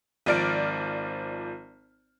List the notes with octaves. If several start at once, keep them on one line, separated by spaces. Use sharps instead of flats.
G#1 F3 D5 F6 D7